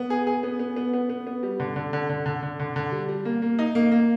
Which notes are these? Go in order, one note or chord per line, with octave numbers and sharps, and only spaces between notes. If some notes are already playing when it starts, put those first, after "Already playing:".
Already playing: B3
G#4
G#4
B3
B3
B3
B3
B3
B3
G3
D3
D3
D3
D3
D3
D3
D3
D3
G3
G3
A#3
A#3
D#4
A#3
A#3